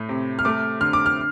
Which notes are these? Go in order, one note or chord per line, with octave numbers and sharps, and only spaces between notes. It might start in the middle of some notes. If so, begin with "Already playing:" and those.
Already playing: A2 A3
C3
F6
A3 D6
D3 F6
D6
F6